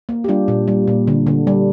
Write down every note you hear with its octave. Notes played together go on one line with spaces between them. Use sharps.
A#3
G4
G3 D4 F4
A#2
G3
A#2
D3
D3
G3